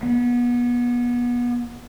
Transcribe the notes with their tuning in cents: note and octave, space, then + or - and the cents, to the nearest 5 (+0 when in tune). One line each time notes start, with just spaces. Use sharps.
B3 -30